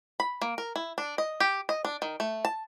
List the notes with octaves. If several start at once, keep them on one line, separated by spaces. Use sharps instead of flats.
B5
A#3
A#4
E4
D4
D#5
G4
D#5
D4
D#3
A3
A5